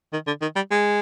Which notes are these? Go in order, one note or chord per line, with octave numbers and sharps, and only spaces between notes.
D#3
D3
D#3
G3
G#3